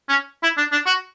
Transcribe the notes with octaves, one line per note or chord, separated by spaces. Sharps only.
C#4
E4
D4
D4
F#4